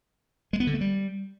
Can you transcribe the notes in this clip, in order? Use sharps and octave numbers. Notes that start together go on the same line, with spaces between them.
G#3
B3
D3
A3
G3